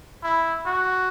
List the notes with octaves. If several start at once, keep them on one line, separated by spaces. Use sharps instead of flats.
E4
F#4